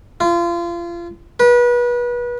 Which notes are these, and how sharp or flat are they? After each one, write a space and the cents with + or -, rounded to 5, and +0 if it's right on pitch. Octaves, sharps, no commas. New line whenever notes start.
F4 -30
B4 -30